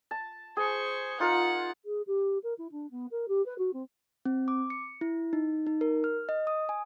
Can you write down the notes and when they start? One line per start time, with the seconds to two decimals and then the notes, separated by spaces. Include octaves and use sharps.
0.11 A5
0.57 G#4 C5 C#6
1.20 D#4 F4 A#4 F#5
1.85 G#4
2.07 G4
2.43 A#4
2.58 E4
2.71 D4
2.90 B3
3.11 A#4
3.28 G4
3.45 B4
3.58 F#4
3.73 C4
4.25 C4
4.48 D6
4.70 C#7
5.01 E4
5.33 D#4
5.67 D#4
5.81 A#4
6.04 F6
6.29 D#5
6.47 D#6
6.69 G#5